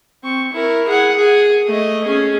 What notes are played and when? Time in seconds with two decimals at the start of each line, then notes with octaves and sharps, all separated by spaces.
0.23 C4 C#6
0.53 E4 A#4
0.87 G#4 F#5
1.16 G#4
1.67 A3 D#5
2.05 C#4 G#4